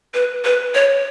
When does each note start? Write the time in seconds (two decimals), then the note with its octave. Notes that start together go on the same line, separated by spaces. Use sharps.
0.14 B4
0.44 B4
0.74 C#5